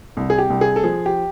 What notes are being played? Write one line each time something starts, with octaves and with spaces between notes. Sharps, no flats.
C2
G#4
G4
C2
G#4
A4
F3 G#4
G4